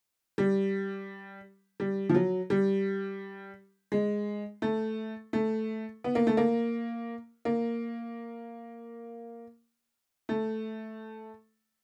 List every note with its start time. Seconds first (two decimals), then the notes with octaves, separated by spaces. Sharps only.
0.38 G3
1.80 G3
2.09 F3
2.14 F#3
2.50 G3
3.92 G#3
4.62 A3
5.33 A3
6.04 B3
6.15 A#3
6.27 A3
6.37 A#3
7.45 A#3
10.29 A3